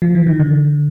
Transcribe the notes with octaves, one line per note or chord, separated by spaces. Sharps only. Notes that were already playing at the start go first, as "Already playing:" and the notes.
F3
E3
D#3
D3